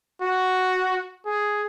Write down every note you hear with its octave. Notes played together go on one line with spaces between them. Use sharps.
F#4
G#4